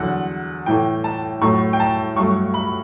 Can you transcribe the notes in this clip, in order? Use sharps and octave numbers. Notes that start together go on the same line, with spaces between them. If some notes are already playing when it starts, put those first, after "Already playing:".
Already playing: E2 D3 F#3 F#5
A2 E3 A3 G5
A5
A2 F#3 A3 C#6
G5
A5
G2 F#3 A3 C#6
B5